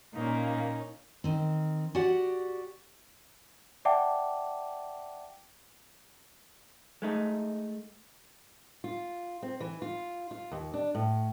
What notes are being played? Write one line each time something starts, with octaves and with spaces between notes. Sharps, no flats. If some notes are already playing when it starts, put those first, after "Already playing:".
A#2 A#3 C#4 D#4
D#3 C4
F#4 G4 D5 F#5
D5 E5 F#5 G5 A5 D6
G#3 A3 D#4
F4
C4
E3
F4
F4
D#2
D4
A2